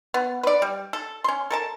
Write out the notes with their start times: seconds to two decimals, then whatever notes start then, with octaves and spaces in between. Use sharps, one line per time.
0.14 B3
0.43 B4 D5
0.62 G3
0.93 A4
1.24 C#4 C6
1.50 A4 A#4 A5